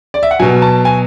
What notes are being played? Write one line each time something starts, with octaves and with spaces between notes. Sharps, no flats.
D5
E5
F#5
B2 F#3 G#5
A5
G#5